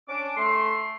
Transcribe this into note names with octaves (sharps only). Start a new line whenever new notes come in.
C#4 D4 D6
A3 C6